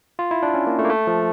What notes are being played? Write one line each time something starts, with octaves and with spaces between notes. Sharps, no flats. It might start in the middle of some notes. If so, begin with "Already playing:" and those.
F4
E4
D4
C#4
A#3
A3
A#3
A3
F3